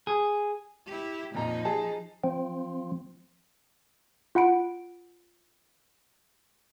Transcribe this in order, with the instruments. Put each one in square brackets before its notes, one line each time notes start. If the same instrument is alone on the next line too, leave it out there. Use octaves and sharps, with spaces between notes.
[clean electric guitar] G#4
[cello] E4 G4
[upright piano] F2 A#2 A#5 [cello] F3 D#4
[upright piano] G#4 A5
[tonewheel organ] F3 C4
[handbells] F4 F#5 B5 D7